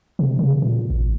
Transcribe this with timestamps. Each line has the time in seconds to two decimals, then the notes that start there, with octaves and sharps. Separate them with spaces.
0.19 C3
0.39 C#3
0.62 A#2
0.90 A1